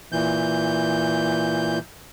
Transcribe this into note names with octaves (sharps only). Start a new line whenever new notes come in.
A#2 E3 G6